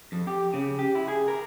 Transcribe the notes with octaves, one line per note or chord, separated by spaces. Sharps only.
F2
G4
C#3
G4
E4
G#4
A#4